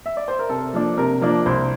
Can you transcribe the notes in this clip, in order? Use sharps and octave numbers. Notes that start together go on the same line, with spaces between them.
E5
D5
C5
A#4
C3 A4
F3 A#3 D4
C3 A#4
F3 A#3 D4
C2 C5